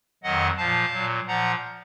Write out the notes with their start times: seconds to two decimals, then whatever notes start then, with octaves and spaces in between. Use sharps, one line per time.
0.23 F2 D#3 F#3 D#5 F#5
0.57 A#2 F3 F5 A5
0.92 A#2 F#3
1.27 A#2 F3 F#5 A#5